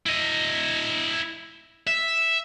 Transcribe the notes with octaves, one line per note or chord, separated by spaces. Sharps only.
E4 D#5
E5